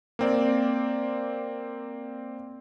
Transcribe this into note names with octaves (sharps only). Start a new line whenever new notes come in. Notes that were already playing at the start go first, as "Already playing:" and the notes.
A#3 C4 D5